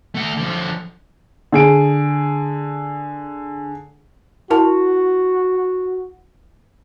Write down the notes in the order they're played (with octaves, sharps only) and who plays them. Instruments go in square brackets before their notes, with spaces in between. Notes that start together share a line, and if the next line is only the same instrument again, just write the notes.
[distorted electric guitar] A3 F#5
D3 F3
[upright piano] D3 G#4 D7
[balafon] E4 A#4 A5 [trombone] F#4